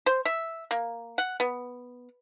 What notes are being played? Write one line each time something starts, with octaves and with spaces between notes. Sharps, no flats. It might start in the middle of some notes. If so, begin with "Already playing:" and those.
C5
E5
A#3
F#5
B3